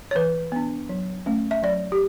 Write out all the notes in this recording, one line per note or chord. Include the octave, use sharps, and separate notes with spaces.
C#5
E3 B4
B3 D4
F#3
A3 C#4
E5
F#3 D5
G4